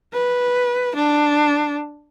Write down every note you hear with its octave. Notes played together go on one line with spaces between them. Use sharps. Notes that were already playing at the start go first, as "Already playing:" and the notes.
B4
D4